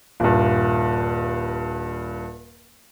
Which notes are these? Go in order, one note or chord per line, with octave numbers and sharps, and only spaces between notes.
D#1 G2